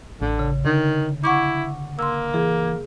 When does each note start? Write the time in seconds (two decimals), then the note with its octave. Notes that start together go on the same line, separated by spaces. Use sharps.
0.21 A1 D3
0.39 C#3
0.65 D3 D#3
1.24 E4 F#5 C#6 D6
1.99 A#3 C6 E6
2.34 E3 G#4